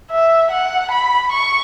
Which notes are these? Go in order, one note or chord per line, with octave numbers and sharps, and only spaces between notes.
E5
F#5
B5
C#6